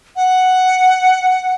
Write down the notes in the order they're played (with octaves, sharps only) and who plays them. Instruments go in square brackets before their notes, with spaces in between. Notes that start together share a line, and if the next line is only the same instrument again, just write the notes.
[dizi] F#5